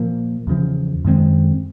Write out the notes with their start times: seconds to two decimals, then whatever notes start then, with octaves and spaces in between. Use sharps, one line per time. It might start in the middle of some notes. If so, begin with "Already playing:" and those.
Already playing: A#2 F3 A#3
0.47 E2 C#3 F3
1.05 F#2 D#3 G#3 C4